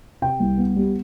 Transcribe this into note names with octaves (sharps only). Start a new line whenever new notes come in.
C3 G5
C2
B3
G3